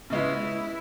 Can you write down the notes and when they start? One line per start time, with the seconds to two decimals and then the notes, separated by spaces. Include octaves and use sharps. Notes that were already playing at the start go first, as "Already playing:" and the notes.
0.10 C#3 G#3 B3 E4